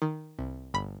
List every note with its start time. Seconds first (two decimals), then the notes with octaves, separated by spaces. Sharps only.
0.02 D#3
0.39 C2
0.74 G1 B5